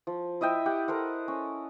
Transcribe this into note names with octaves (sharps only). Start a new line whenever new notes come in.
F3
E4 D#5 E5 G5
G4 F#5
A4 A#4 C5 F#5
C#4